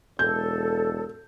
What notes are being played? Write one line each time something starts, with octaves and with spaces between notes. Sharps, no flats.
E1 A4 G6